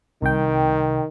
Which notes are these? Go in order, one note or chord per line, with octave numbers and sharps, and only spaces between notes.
C2 D#3 G5